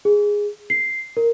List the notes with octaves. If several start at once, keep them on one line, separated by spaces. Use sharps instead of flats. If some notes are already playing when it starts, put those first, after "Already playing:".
G#4
C7
A#4